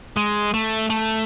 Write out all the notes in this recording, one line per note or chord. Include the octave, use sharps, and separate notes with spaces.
G#3
A3
A3